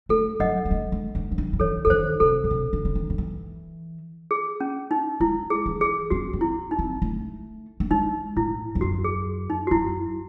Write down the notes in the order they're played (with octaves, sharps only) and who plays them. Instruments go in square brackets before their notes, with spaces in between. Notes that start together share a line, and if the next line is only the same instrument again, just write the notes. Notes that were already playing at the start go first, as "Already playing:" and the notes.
[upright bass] A3 [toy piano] A4
[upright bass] F#3 [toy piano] D#5 F#5
[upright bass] C4
A3
G#3
E3
E3
D#3
D#3
[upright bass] E3 [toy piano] A4 C#5
[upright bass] E3 [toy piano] A4
[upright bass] D#3 [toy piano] C5
[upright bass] C3 [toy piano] A4
[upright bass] A2
C3
D#3
C#3
D#3
D#3
E3
[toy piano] G#4
C#4
D#4
[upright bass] G#3 [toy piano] E4
[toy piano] G#4
[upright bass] E3
[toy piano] G#4
[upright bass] C#4 [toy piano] F#4
[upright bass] C4
[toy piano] E4
D#4
[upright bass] C4
A3
A3
[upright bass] G#3 [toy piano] D#4
[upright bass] A2 [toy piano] E4
[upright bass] E2
[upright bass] F#2 [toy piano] F#4
[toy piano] G#4
D#4
F#4
[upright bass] F#2 [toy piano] E4